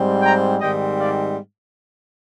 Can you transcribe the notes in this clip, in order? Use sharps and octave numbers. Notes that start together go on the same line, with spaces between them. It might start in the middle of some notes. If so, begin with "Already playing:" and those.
Already playing: G#2 G3 C4
G5 A#5
G#2 D#3 G3 C4 D#5 G5
D5 F5